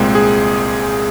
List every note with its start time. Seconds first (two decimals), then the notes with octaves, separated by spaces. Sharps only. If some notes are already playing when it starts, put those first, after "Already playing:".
Already playing: C2 A#2 G#3 C4
0.15 G#4